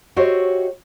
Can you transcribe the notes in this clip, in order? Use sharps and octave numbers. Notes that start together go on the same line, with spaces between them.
F#4 G4 C5 C#5 D#5 E5